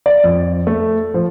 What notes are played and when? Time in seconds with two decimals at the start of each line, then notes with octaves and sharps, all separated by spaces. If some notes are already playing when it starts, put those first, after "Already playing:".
0.06 D5
0.24 F2
0.67 A3
1.14 F3